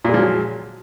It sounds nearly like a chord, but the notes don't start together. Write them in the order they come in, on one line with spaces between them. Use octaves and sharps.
A#2 G#3 F3 F#3